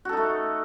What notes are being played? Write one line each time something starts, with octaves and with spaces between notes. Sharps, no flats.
A3 D#4 F#4 A4